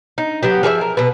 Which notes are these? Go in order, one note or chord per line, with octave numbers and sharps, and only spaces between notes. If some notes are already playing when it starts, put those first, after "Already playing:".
D#4
F#3 B3 G4
F3 G#4 A#4 E5
A#4
B2 B4